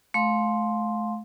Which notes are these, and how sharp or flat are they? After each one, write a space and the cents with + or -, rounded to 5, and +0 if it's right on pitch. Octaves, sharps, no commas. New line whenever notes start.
A3 -35 F5 +20 C6 +0